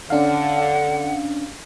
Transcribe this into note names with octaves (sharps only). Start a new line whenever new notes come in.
D3 C#4 D4 F5 F#5